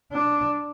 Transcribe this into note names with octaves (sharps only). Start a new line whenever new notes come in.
D4